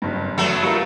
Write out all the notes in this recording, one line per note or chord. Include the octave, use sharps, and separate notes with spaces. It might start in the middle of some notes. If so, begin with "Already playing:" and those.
F#1 G2
F#3 A3 B3
G3 F4 A#4